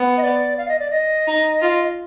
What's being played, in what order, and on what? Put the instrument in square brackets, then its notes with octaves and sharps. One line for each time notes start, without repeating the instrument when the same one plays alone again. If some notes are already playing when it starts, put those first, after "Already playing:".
Already playing: [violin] B3
[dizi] D#5
D5
F5
D#5
D5
D#5
[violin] D#4
F4